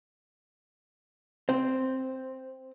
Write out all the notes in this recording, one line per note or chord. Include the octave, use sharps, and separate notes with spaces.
C4